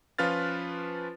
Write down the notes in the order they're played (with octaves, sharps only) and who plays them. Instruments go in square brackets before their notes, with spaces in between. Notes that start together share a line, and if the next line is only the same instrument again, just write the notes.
[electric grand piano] F3 C#4 F4 B4 F6 A6